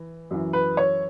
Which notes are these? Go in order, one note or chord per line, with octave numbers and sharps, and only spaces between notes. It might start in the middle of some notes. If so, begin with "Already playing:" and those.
Already playing: E3
F#2 E3
B4
C#5